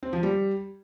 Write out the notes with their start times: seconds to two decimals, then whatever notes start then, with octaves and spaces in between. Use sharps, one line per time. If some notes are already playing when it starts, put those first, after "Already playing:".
0.03 C4
0.13 F3
0.23 G3